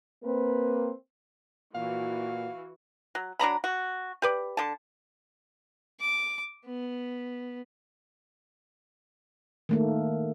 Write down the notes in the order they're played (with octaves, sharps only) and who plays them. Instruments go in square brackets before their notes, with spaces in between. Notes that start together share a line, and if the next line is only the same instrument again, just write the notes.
[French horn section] A#3 C4 B4
[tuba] A#2 [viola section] E3 F#4 [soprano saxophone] F5
[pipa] F#3
F#3 D4 A#5 B5
F#4
G4 B4 D5
D3 A5
[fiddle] D6
B3
[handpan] D#3 A3 A#3